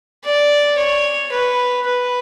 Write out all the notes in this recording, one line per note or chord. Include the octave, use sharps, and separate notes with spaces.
D5
C#5
B4
B4